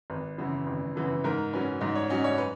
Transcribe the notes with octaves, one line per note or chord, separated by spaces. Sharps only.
G#1 B4
F#2 C#3 E3 B3
G#1
F#2 C#3 E3 B3
G#2 A#4
F#3 C#4 B4
G#2 D#5
C#5
F#3 C#4 D#5
C#5
B4